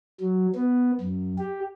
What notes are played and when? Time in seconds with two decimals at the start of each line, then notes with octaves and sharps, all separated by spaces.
0.21 F#3
0.55 B3
1.01 F#2
1.38 G4